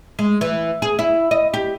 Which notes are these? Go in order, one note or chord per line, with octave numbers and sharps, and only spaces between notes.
G#3
E3
G#4
E4
D#5
G4